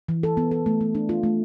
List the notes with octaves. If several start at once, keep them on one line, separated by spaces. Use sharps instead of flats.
E3
A4
B3
A4
A3
A3
D4
F4
A3